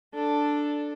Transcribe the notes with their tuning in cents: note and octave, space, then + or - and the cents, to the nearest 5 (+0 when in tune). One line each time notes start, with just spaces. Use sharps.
D4 +0 A4 +0